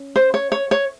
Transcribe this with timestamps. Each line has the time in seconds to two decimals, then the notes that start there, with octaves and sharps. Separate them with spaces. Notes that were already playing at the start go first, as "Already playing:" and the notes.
Already playing: C#4
0.16 C5
0.34 C#5
0.52 C#5
0.71 C#5